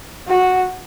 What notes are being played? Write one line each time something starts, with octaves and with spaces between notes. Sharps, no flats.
F#4